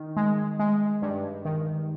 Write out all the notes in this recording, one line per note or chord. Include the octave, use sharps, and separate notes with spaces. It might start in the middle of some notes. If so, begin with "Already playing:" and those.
Already playing: D#3
G#3
G#3
G2
D#3